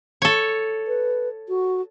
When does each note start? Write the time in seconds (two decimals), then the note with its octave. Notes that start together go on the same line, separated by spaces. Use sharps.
0.22 A4 C#5
0.87 B4
1.49 F#4